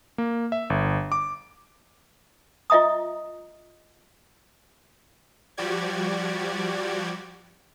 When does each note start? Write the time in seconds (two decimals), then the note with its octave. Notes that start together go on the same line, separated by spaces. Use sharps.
0.18 A#3
0.52 E5
0.70 G1
1.12 D6
2.70 F4 D#5 E5 A#5 D#6
5.57 F3 G3 F#4 G4 D5 G#6